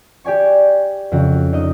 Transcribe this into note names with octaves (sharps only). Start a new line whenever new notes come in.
G4 D5 G#5 C#6
F2 C#3 F#4
D#4 D#5